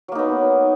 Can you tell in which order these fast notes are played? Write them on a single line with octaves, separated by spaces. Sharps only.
F#3 A#3 D#4 B3